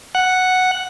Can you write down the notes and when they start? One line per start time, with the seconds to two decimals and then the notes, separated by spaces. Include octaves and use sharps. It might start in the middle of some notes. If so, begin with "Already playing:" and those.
0.15 F#5